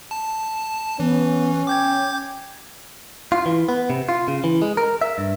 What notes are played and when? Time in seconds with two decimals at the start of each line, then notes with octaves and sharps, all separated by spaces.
0.11 A5
1.00 E3 B3 C#4
1.67 G5 D6 G6 G#6
3.32 F4
3.46 E3
3.69 B3
3.90 C3
4.09 F4
4.28 C#3
4.44 E3
4.62 G#3
4.77 A#4
5.02 E5
5.18 G2